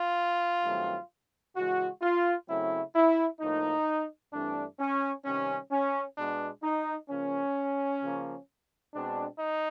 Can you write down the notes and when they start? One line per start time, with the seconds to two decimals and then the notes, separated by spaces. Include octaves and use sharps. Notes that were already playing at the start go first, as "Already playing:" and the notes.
Already playing: F4
0.64 G2 D#3 F#3 A3 C4
1.56 C#3 E3 G#3 F#4
2.02 F4
2.48 C#3 F#3 A3 C4 E4
2.95 E4
3.41 A2 F3 A#3 D#4
4.33 G2 E3 A3 C4 D4
4.80 C#4
5.25 C3 D#3 G3 C#4
5.71 C#4
6.17 B2 G#3 B3 D4
6.63 D#4
7.10 C#3 F3 A#3 C#4
8.02 C#3 F3 A#3
8.94 B2 G#3 C4 D4
9.40 D#4